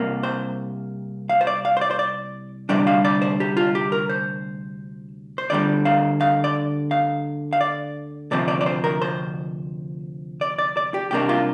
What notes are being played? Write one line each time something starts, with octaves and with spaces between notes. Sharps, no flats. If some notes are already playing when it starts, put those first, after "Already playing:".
Already playing: C2 C3 A#3
C5
F5
C5
D5
F5
C5
D5
C5
D5
D2 C3 G3 D4 D5
F5
D5
C5
G4
F4
G4
A#4
C5
C5
D2 D3 G3 D5
F5
F5
D5
F5
F5
D5
D2 C3 F3 C4 D5
D5
D5
C5
A#4
C5
D5
D5
D5
G4
C2 C3 A#3 D4 G4
F4